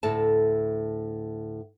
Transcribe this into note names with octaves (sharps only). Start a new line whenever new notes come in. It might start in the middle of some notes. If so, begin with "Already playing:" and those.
D2 A2 A4 A5